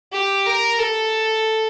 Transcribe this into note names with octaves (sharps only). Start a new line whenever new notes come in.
G4
A#4
A4